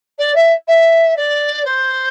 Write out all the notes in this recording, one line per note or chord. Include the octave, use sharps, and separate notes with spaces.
D5
E5
E5
D5
C5